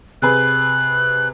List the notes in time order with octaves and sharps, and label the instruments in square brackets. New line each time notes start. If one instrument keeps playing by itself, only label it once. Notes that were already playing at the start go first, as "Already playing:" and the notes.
[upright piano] C3 G#4 B4 [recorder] F#6